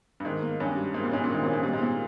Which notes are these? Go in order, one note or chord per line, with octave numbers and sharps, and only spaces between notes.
G2
G#2 D#3
A#3
G2 C#4
G3
G#2 A#3
A#2
G#2 C#4
A#2
G#2 D#3
A#2 C#4
G#2
A#2 G3
G#2
A#2 A#3